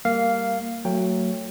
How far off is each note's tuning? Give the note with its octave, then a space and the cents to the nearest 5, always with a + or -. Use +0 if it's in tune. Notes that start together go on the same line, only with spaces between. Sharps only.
G3 +0 A#3 -15 F5 -5
F#3 +0 A3 +35 G5 +15